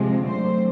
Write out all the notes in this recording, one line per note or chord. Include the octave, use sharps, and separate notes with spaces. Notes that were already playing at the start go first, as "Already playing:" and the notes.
Already playing: C3 F3 G#3 C4
F#2 D3 F#3 A3 C4 C5